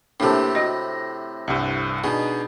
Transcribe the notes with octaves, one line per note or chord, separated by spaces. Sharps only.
A2 C3 A#3 D4 G4 A4 A5
F#4 D#5 B5 A#6
C2 G2
B2 D4 D#4 G#4